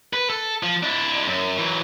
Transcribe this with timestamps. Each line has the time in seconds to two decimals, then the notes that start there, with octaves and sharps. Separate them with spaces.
0.13 B4
0.30 A4
0.63 F3
0.83 D4 E4
1.26 F#2
1.58 E3 F#3